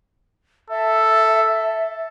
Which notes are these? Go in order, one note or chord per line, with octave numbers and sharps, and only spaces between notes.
A4 E5